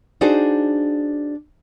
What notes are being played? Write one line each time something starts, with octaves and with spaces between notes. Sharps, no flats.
D4 D#4 F#4 G#4 C5 D5